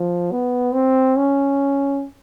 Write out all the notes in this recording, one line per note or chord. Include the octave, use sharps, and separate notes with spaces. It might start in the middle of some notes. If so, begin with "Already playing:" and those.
Already playing: F3
B3
C4
C#4